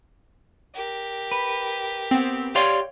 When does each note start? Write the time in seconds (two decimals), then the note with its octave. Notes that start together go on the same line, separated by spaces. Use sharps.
0.75 G4 A#4
1.32 B4
2.11 B3 C4
2.55 G4 C#5 D5 F5 G5 C6